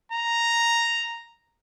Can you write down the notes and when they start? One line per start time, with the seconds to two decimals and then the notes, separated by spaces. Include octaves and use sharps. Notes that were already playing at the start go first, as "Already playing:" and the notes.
0.12 A#5